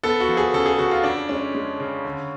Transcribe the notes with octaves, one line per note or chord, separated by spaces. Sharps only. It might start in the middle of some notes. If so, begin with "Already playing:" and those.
B3 A4
F#4
F3
G#4
C#3 A4
G#4
C#3 F#4
F4
F2 D4
G#3 C#4
G#3
C#3
D3